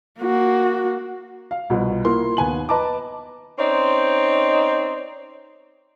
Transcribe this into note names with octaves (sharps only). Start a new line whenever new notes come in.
A#3 F#4
F5
C2 B2 F3
A#3 E4 F4 A#4 C6
D#2 B3 G#5 F#7
B4 D#5 A5 A#5 D6
C4 C#4 D#4 C5 D5